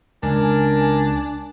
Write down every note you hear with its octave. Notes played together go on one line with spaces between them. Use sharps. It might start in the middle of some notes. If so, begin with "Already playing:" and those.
C#2 D4 A#4 G#5